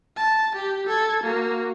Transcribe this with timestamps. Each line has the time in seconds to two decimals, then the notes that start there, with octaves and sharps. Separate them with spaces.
0.17 A5
0.56 G4
0.86 A4 G#6
1.24 A#3 F#4